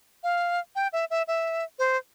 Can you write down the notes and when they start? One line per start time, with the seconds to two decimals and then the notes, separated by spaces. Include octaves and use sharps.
0.23 F5
0.75 G5
0.93 E5
1.10 E5
1.28 E5
1.79 C5